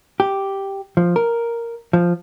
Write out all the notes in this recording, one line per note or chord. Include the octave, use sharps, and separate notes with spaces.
G4
F3
A#4
F3